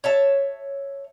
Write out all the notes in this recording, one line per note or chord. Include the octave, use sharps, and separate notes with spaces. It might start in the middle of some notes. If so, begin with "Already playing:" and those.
C#5 E5 A5